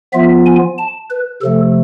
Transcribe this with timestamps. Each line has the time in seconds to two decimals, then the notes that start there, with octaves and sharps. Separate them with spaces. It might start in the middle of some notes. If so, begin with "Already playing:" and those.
0.13 F3 B3 F4 E5
0.46 G#5
0.78 A5
1.10 B4
1.42 C3 F3 A3 A4